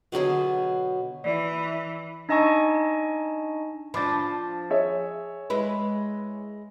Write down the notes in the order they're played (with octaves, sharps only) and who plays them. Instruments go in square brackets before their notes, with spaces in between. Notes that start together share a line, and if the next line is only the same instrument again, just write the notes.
[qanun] B2 D3 F#3 G#4
[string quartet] E3 [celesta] D5
[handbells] D4 D#4 D#5 G#5 A5 C#6
[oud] F3 D4 [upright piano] B5 D6 A6
[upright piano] G#4 C#5 E5
[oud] G#3 E4 B4